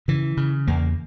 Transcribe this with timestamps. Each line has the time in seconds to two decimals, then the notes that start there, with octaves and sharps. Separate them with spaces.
0.08 C#3 E3
0.37 C#3
0.67 E2 A#3